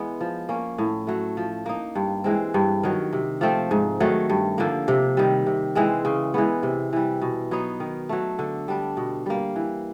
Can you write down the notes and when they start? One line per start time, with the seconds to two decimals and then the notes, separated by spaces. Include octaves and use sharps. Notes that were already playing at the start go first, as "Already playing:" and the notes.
Already playing: E3 G#3 B3
0.21 F3
0.49 A#3 C#4
0.78 A2
1.07 F#3 A3
1.37 F3
1.66 A#3 D#4
1.95 G2
2.24 E3 G#3 C4
2.54 G2
2.83 D#3 F#3
3.13 C3
3.41 F3 A3 C4
3.71 G#2
4.00 D#3 F#3 A3
4.30 G2
4.58 D3 F3 A#3
4.88 C3
5.17 D#3 G3
5.46 C3
5.75 E3 G#3 C4
6.05 C#3
6.34 E3 G#3 B3
6.63 C3
6.93 E3 G3
7.22 B2
7.51 F#3 B3 D#4
7.80 D#3
8.09 F#3 A3
8.39 D3
8.68 G3 B3 D4
8.97 B2
9.26 G3 A#3
9.56 E3